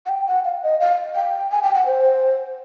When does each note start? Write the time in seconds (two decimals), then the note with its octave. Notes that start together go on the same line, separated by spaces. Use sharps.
0.06 F#5
0.09 G5
0.27 F#5
0.45 F5
0.63 D#5
0.80 F5
1.16 G5
1.51 G#5
1.63 G5
1.74 F#5
1.86 C5